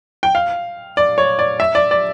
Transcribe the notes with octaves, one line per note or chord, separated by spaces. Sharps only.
G5
F5
D5
C#5
D5
E5
D5
D5